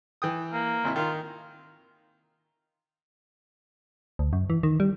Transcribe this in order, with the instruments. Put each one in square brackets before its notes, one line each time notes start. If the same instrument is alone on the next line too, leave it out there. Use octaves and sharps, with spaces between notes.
[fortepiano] E3 G5 D#6
[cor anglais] A#3
[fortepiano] G#1 C3 E4
[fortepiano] D#3 [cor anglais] F4
[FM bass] D2
F#2
E3
D#3
G3